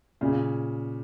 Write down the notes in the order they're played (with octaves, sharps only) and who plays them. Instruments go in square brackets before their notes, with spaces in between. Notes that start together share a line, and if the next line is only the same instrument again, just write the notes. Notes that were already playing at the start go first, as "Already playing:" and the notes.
[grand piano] A#2 C#3